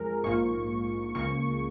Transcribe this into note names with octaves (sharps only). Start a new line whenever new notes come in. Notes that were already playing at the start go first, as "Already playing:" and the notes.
Already playing: F2 F3 G#3 G#4 A#4
A#1 G#2 F3 A#3 F4 C#6
C#2 C#3 F3 A#3 C#6